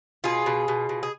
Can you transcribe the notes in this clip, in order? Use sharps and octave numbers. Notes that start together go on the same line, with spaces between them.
B2 F4 G#4
B2
B2
B2
G#4